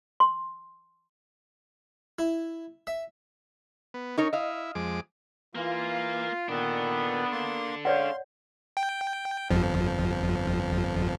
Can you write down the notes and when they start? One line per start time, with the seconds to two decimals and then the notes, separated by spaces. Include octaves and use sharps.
0.20 C6
2.19 E4
2.87 E5
3.94 B3
4.17 C#4 D#4 A#4 C#5
4.33 E4 D#5 F5
4.75 F2 G#3 D6
5.55 E3 A#3 F4
6.48 A#2 D#3 B3 D4 A4
7.32 A#3 C6
7.85 G#3 C#4 C#5 D5 F5 F#5 C6
8.77 G5
9.50 G1 F2 F3